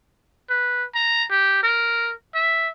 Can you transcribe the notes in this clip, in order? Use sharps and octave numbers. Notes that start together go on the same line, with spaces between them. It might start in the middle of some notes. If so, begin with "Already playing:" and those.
B4
A#5
G4
A#4
E5